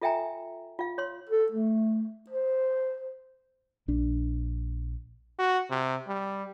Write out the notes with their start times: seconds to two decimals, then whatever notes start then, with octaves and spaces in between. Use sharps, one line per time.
0.02 F4 A4 E5 G5 G#5 A#5
0.79 F4 F5
0.98 C#5 C6
1.30 A4
1.52 A3
2.30 C5
3.88 A#1 D4
5.39 F#4
5.70 C3
6.08 G3